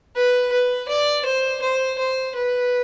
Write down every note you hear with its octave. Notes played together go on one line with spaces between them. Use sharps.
B4
B4
D5
C5
C5
C5
B4